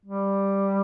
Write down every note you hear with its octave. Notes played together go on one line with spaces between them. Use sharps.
G3